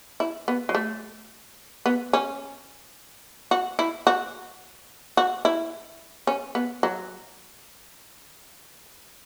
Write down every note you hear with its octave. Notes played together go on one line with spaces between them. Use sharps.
E4
B3
F#3
A3
B3
C#4
F#4
E4
F#4
F#4
E4
C#4
B3
F#3